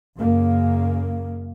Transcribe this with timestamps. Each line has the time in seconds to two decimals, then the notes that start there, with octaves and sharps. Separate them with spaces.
0.17 F#2 C#3 A#3